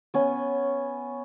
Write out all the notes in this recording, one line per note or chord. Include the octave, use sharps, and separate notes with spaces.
B3 C#4